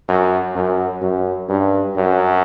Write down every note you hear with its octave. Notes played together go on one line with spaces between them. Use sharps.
F#2
F#2
F#2
G2
F#2